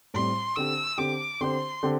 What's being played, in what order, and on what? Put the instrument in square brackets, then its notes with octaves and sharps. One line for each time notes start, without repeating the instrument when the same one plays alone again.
[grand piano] A2 G3 C4 [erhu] C6
[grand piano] D3 C4 G4 [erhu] E6
[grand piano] D3 C4 G4 [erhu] D6
[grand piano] D3 C4 G4 C5 [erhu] C6
[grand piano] D3 C4 G4